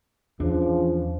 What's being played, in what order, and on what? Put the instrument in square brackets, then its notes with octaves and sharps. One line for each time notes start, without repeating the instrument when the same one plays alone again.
[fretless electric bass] E2 D4 [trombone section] C#3 F3